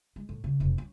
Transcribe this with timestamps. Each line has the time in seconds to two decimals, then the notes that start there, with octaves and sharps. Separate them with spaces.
0.16 G#3
0.29 A2
0.44 C#3
0.60 F1 C3
0.78 C#4